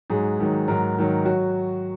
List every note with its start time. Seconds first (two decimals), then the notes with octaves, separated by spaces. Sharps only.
0.10 G#2 F#3 G#4
0.39 G#2 D#3 F#3
0.68 G#2 F#3 A#4
0.96 G#2 D#3 F#3
1.25 F#3 F#4